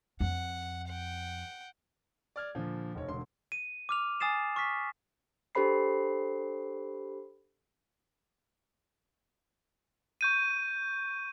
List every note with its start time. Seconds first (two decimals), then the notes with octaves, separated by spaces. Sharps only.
0.20 F2 F#5
0.87 F#5 G5
2.36 D5 F6 G#6
2.55 A#2 D3 F3
2.95 F1 C#5
3.08 E1 D3 C6
3.52 D#7
3.89 D6 F6 F7
4.20 G#5 D#6 A6 C7 E7
4.56 C#6 F6 B6
5.55 D4 G4 A4 C5 B5 C7
10.21 C#6 G6 D#7